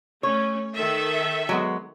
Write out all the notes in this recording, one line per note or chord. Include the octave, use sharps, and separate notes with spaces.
A3 C#4 C#5
D#3 A4 E5
F#3 G#3 B3